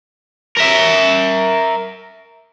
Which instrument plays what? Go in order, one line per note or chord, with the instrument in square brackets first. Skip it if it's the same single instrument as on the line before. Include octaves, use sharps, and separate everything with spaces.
[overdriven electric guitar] A#4 E5